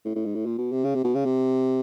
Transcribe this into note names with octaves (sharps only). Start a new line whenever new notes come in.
A2
A2
G#2
A2
A#2
B2
C3
C#3
C3
B2
C#3
C3